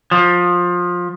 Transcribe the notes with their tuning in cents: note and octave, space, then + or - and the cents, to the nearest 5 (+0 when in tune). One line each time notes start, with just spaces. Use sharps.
F3 +20